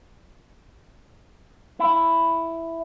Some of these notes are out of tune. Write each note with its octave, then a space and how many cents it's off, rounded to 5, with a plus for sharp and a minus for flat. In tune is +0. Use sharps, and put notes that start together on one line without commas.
E4 +5